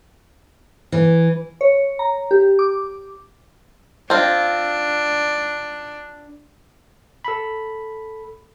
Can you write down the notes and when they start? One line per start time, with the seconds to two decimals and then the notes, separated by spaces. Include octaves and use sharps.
0.92 E3
1.61 C#5
1.99 A#5
2.31 G4
2.59 D6
4.10 C4 D4 F4
7.25 A4 B5